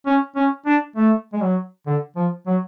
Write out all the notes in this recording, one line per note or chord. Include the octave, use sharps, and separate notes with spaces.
C#4
C#4
D4
A3
G#3
F#3
D3
F3
F#3